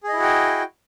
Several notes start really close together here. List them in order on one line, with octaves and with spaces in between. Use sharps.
G#4 D#5 E4 F#4 G5